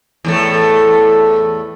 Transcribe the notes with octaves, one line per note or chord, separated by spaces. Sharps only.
E2 A2 A3